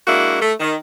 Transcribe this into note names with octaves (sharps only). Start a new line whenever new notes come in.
G#3 A#3 D4 E4 F#4
A3
D#3